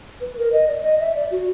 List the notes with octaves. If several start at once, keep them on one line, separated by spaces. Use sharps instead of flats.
B4
A#4
D#5
D5
D#5
E5
D5
F#4